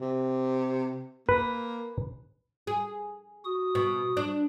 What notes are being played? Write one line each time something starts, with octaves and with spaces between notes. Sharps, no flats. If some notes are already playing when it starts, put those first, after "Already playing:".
C3
A#3 B4
G#4
F#4 D#6
B2
D4